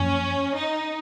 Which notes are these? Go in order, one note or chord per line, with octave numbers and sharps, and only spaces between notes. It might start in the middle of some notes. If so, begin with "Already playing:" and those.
Already playing: F#2 F3 A#3 C#4
D#4